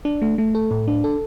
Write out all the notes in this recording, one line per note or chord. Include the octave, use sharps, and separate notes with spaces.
D4
A3
A3
A4
A2
D4
A4